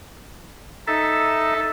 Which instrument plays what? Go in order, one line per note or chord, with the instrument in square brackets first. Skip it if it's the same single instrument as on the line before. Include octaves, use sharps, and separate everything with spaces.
[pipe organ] D#4 E5 [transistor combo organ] A4